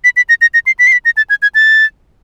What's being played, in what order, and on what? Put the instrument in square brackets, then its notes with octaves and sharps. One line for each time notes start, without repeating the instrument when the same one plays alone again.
[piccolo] B6
B6
A#6
A#6
A#6
C7
B6
C7
B6
A#6
A6
G#6
G#6
A6